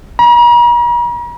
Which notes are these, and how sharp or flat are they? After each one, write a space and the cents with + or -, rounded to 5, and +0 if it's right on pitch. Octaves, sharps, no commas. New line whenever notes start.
A#5 +45